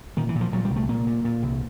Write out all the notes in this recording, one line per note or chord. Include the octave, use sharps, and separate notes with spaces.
A#2 D#3
E3
A#2
F3
A#2 F#3
G3
C2
A3
A#2 A#3
A#2
A#2
C2